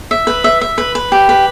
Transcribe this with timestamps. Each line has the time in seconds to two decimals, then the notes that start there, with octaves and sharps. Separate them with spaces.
0.11 E5
0.27 B4
0.44 E5
0.61 E5
0.78 B4
0.95 B4
1.12 G4
1.29 B4